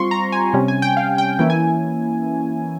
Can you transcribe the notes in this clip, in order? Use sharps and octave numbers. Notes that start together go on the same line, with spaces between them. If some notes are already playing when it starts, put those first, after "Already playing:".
Already playing: G3 C4 F4 C6 C#6
A#5
G#5
C3 G3 C#4
G#5
G5
F5
G5
E3 A#3 C#4 E4 G5
G#5